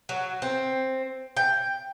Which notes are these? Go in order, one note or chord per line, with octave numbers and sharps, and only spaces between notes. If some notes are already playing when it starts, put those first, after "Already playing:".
F#3
C4
G5